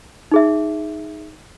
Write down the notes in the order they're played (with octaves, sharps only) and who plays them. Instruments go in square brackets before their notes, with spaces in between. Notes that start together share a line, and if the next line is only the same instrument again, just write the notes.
[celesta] D#4 G#4 E5